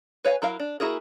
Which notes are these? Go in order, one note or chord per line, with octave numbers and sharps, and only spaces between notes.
B4 C#5 F5 G#5
F#3 E4 A#4 F5
D4
A#3 E4 F#4 G#4 A#4